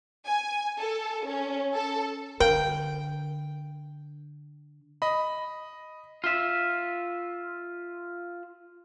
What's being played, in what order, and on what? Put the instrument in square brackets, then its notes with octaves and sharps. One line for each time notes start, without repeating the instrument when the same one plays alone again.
[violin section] G#5
A4
C#4
A4
[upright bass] D3 [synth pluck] A#4 F5 [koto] G5
[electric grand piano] D#5 B5
[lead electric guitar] F4 E5